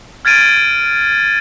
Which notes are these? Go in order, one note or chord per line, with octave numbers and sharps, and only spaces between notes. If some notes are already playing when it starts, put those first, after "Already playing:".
F6 G#6 A6 D7 D#7